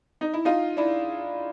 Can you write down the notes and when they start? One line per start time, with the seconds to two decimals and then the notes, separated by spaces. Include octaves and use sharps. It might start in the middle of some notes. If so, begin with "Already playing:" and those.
0.21 D#4
0.34 E4
0.45 D#4 F4
0.77 D4 E4